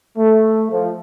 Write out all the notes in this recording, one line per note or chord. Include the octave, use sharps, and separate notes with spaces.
A3
F3